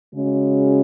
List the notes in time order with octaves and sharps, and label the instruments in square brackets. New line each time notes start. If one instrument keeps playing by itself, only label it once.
[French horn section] C#3 G#3 C#4 F#4